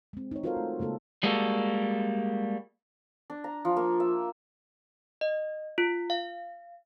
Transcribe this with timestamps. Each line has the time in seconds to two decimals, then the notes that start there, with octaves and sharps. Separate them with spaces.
0.13 G#3 C4
0.31 D#4 C#5
0.44 F4 F#4 A4 A#4 C5 F5
0.57 A3
0.80 C#3 G#3 A#3 A4
1.23 G3 G#3 A#3 F#4 A4
3.30 D4
3.44 A#5
3.65 F3
3.77 A#3
4.00 E5
5.21 D#5
5.78 F4
6.10 F5